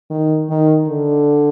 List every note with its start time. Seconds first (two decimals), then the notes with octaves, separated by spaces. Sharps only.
0.10 D#3
0.50 D#3
0.87 D3